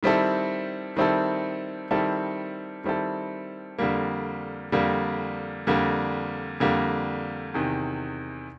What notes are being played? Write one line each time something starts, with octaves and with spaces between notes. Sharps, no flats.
D#3 G3 C4 E4 A4
D#3 G3 C4 E4 A4
D#3 G3 C4 E4 A4
D#3 G3 C4 E4 A4
F2 D3 G3 A#3
F2 D3 G3 A#3
F2 D3 G3 A#3
F2 D3 G3 A#3
E2 C3 D#3